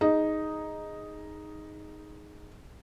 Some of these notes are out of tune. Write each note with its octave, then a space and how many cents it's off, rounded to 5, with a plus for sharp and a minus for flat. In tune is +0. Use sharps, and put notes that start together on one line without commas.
D#4 +0 G#4 -5